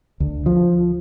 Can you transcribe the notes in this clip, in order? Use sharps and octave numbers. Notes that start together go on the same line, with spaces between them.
D2
F3